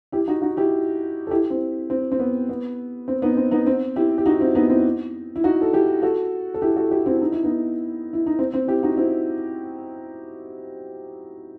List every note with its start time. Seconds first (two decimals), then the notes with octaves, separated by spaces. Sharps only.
0.12 E4 G4
0.28 D#4 F#4
0.42 D#4 F#4
0.57 E4 G4
1.27 A4
1.31 E4 G4
1.50 C4
1.90 C4
2.12 C4
2.19 B3
2.49 B3
3.08 C4
3.22 B3 D#4
3.37 C4
3.51 B3 D#4
3.67 C4
3.96 E4 G4
4.18 G4
4.26 D#4 F#4
4.41 C4 E4
4.55 B3 D#4
4.70 C4 E4
5.36 E4
5.44 D#4 F#4
5.61 A4
5.73 E4 G4
6.02 F#4 A4
6.54 A4
6.62 E4 G4
6.76 F#4 A4
6.91 E4 G4
7.06 C4 E4
7.21 D#4
7.32 E4
7.44 B3 D#4
8.13 E4
8.26 D#4
8.39 C4
8.54 C4
8.68 E4 G4
8.83 D#4 F#4
8.97 C4 E4